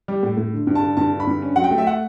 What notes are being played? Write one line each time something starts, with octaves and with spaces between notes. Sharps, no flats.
G3
A2
A2
D3
G2
A5
D3
G2 A5
D3
B5
G2
C#4
F#3 F#5
G5
A3
E5
F#5